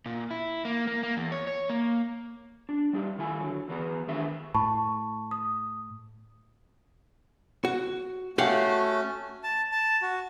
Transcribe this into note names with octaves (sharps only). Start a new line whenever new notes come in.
A#2
E4
A#3
A#3
A#3
E2
C#5
C#5
A#3
D4
G3 D#4 G4
D#3 A3 E4 G#5
D3 F#3
E2 E3 B3 A#5
D#3 E3 D4 G4 E5
A2 A5 B5 C#6
D#6
F#4
A3 C#4 F#4 G4 F5 F#5
A5
A5
F#4